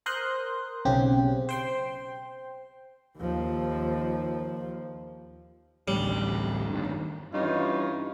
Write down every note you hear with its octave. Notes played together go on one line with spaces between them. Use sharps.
A#4 C5 C6 D#6 F#6
B1 C#3 C4 G4
C5 G5 C6
D#2 F3
A1 D2 G3
G2 D#3
G2 E3 C#4 D#4 F4